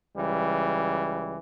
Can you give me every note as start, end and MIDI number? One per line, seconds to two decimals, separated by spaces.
0.16 1.37 37
0.16 1.37 52
0.16 1.37 55